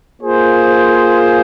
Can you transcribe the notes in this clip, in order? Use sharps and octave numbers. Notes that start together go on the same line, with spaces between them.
A#3 F4 G#4 C5